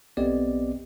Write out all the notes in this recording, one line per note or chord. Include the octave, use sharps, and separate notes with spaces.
B1 B3 C4 G4 D5 D#5